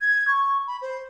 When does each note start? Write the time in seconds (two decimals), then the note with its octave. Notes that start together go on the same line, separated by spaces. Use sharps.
0.01 G#6
0.28 C#6
0.67 B5
0.82 C5